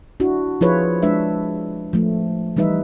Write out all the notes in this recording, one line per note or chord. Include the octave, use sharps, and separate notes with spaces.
D4 E4 F#4
F3 E4 F4 G#4 B4 C#5
G#3 D4 B4 E5
F3 A3
E3 G3 D#4 B4 E5